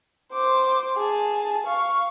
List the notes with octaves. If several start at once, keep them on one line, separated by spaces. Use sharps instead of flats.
C5 D6
G#4 A5
F5 C#6